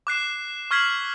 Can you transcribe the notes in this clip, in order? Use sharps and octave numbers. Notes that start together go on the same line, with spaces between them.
D6 F#6 C7 E7
C#6 F6 G#6 B6 C7 F#7